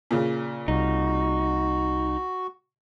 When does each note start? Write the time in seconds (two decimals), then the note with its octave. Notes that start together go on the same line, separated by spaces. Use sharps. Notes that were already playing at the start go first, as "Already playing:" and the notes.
0.11 A#2 C#3
0.68 C2 D#4 F#4